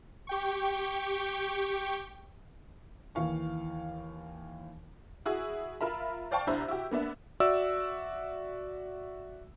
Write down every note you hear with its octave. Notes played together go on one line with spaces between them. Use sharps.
G4 G5 C#6
D#2 E3 F5 C#6
E4 F#4 G#4
F4 A#4 E5 B5
C5 D5 F5 G5 A5 C#6
C2 D4 E4 C5 A#5
E4 F#4 G4
A#3 B3 D4 E5
F#4 D5 E5 E6